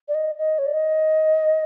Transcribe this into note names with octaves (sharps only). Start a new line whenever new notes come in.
D5
D#5
D#5
C#5
D5
D#5